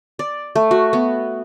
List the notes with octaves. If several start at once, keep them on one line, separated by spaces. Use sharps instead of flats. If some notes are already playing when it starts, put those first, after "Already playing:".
D5
A3
F#4
B3